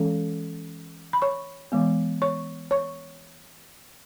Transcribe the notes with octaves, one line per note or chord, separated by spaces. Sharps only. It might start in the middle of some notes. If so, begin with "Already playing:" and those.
Already playing: E3 G#3 C#4 A4
B5
C#5 C#6
E3 G#3 B3
C#5 C#6
C#5 C#6